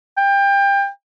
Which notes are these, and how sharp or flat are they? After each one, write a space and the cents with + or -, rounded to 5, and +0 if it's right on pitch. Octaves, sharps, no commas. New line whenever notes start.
G5 +25